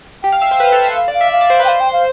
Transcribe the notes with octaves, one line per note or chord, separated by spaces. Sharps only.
G4 G5
F5
E5
C5
B4
A4
E5
F5
D5
F5
E5
E5 F5
D5
C5
B4
G5
C5 F5
G5
F5